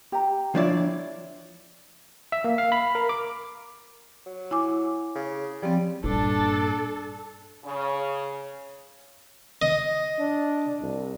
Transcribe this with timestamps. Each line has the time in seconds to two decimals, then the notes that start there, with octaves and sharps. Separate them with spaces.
0.12 G4 A#5
0.55 F3 D4 E4 C#5 D5
2.32 E5
2.44 A#3
2.58 F5
2.72 B5
2.95 A#4
3.09 D6
4.26 F#3
4.51 E4 G#5 D6
5.16 C#3
5.62 F3 G3 C4
6.04 G2 A#2 D4 A4
7.64 C#3
9.62 D#5
10.19 D4
10.81 C2